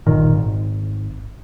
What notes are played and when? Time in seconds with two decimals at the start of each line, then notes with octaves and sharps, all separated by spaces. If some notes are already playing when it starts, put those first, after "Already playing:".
0.07 G1 A#2 D#3
0.34 G#1